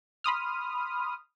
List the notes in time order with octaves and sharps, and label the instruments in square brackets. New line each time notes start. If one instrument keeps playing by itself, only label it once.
[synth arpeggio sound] B5 C6 D#6 F6